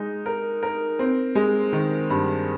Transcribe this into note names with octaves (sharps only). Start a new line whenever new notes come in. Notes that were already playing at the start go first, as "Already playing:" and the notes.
Already playing: G#3 D#4
A#4
A#4
C4
G#3
D#3
G2